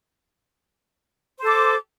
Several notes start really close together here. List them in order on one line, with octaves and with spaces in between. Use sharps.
C5 A4 D6